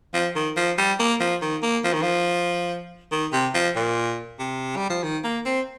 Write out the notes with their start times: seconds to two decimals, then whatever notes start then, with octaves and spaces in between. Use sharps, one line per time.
0.14 F3
0.36 D#3
0.57 F3
0.78 G3
0.99 A#3
1.20 F3
1.42 D#3
1.63 A#3
1.84 F3
1.93 D#3
2.02 F3
3.12 D#3
3.33 C3
3.54 F3
3.76 A#2
4.39 C3
4.76 G3
4.90 F3
5.03 D#3
5.24 A#3
5.45 C4